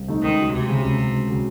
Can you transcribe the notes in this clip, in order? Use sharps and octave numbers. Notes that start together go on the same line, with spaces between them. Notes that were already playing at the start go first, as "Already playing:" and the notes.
Already playing: C2
C3 D#3 A3 D#4
C#2 D#3
C#3 F#3
C#2 C3
C#3 F#3
C#2
C#3 F#3
C#2
C#3 F#3